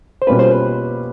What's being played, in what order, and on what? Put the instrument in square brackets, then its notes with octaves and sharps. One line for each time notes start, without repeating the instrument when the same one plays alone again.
[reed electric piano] C5
[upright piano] B2 G3 A#3 C#4 F4 [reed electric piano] B4
[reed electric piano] C5
B4